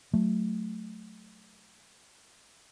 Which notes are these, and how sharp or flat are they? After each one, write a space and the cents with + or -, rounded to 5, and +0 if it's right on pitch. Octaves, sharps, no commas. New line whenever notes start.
F#3 +0 A3 +0